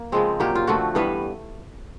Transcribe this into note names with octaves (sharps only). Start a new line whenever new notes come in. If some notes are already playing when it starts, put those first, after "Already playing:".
Already playing: A#3
C#3 F3 G#3 C4
A#2 F#3 A#3 G4
F4
D3 F3 A3 C4 F#4
G2 E3 G3 B3 B4